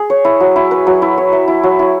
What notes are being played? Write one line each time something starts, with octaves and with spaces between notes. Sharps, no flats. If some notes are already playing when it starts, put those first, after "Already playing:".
Already playing: G#4
C#5
E4
F#3
E4
B4
F#3
E4
C#5
E5
E4
F#3
E4